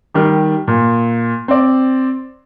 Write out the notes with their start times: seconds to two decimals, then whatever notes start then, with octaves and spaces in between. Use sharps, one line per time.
0.14 D#3 G3 G4
0.68 A#2
1.48 C4 D5